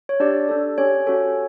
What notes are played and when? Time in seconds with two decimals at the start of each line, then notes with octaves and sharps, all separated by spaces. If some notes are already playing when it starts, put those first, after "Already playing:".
0.09 C#5
0.20 D4 G4 D5
0.49 D4 A4
0.78 C#4 G4 C#5
1.07 C#4 F#4 A4 C#5